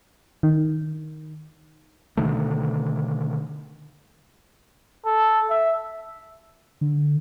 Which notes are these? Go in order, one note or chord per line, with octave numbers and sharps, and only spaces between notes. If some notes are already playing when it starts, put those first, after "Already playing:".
D#3
B2 D3 D#3 A3
A4
E5
D3